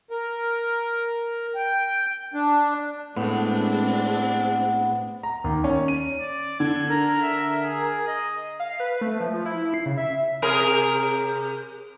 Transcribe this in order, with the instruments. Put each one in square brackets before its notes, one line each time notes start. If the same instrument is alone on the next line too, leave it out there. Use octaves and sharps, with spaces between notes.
[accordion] A#4
G5
D4
[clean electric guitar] A2 [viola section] G#3 C4 D4 [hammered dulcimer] B3
[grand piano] A#5
D#2
C#4
D#7
[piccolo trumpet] D5
[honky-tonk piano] D3 [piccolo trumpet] G#6
[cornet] A#4 [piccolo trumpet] A#5
[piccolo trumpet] E5
G#4
D#5
[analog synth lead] F5
B4
A3
F3
F3
E4
E4
C7
C#3
E5
[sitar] C3 G#4 A#4